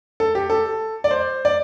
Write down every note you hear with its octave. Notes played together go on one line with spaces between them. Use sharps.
A4
G4
A4
D5
C5
D5